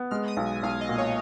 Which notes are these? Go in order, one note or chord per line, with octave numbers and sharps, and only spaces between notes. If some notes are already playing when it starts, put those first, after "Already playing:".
Already playing: B3
G#3 F6
D#6
B1
G#5
B1 F5
D#5
A#2
C#5